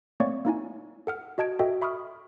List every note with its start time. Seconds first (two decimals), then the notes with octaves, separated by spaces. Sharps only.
0.20 A3 A#3 C4 C#5 D5 C#6
0.45 A#3 D#4 E4 G#5
1.07 A4 F#5 F6
1.38 F#4 D#5 A5 G#6 D7
1.59 F#4 A4 D#5 E5 G5
1.81 E5 B5 C#6 D#6 F6